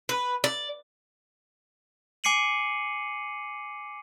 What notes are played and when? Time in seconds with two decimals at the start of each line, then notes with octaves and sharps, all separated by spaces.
0.09 B4
0.44 D5
2.24 G#5 D6 C7 C#7 D#7 F#7